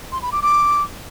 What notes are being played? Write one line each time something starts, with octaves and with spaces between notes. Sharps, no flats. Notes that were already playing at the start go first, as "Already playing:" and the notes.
C6
B5
D6
D6